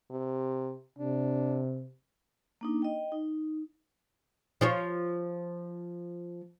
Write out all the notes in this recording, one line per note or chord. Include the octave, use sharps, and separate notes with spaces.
C3
C3 D4
A#3 D4 D#4
D#5 G5
D#4
F3 F4 C#5